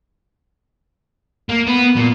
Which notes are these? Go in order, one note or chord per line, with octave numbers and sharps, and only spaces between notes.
A#3
B3
A#2